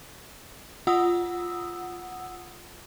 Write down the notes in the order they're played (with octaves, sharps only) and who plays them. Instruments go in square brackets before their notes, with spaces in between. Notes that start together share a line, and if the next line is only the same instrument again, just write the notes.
[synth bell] F4 F#5 D#6 E6